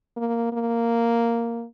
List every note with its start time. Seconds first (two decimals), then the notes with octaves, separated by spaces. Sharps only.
0.17 A#3
0.52 A#3